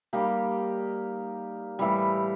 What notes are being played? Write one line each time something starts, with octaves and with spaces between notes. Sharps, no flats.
G3 A#3 D#4 G4
A2 E3 G3